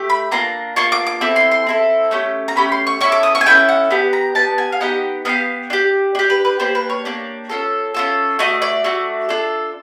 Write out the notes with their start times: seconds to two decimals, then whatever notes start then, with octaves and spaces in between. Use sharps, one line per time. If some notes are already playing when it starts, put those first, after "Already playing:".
Already playing: A3 G4
0.10 B5
0.31 A#3 D4 F4 A#5
0.76 A#3 D4 F4 C#6
0.92 D6
1.06 D6
1.21 C4 E4 A4
1.36 C6
1.51 C6
1.67 C4 E4 A4
2.11 A3 C#4 E4 G4
2.48 A#5
2.56 A3 C#4 G4 B5
2.72 C6
2.87 C#6
3.01 C#4 E4 A4 C#6
3.12 D6
3.23 D#6
3.35 C#6
3.41 G#5
3.46 C#4 E4 A4 G5
3.69 F#5
3.91 B3 D4 G4
4.13 A#5
4.35 B3 D4 G4 A5
4.58 G#5
4.72 F5
4.81 B3 D#4 G4 F#5
5.25 B3 D#4 G4 F5
5.70 D4 G4
6.15 D4 G4
6.30 B4
6.45 B4
6.59 A#3 D4 G4 C5
6.75 B4
6.90 C#5
7.05 A#3 D4 G4
7.49 C#4 F4 A4
7.94 C#4 F4 A4
8.39 A3 D4 F#4 D#5
8.62 D5
8.84 A3 D4 F#4
9.29 D4 F4 A4